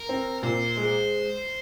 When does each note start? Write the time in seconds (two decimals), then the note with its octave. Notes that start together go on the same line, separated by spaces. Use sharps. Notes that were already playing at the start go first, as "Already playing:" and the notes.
Already playing: A#4
0.09 C4
0.43 A#2 C5
0.77 G#3